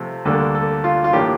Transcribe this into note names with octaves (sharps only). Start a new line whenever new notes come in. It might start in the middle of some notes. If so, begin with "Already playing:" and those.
Already playing: C3 F3 A3
D2 D3 G3 A#3 D4 A4
A4
F4
F4
A2 E3 A#3 D4 G4